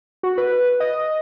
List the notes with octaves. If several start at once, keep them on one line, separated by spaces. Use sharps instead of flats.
F#4
B4
D#5